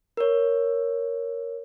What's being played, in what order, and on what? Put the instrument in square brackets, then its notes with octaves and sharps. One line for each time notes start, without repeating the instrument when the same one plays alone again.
[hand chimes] A#4 C#5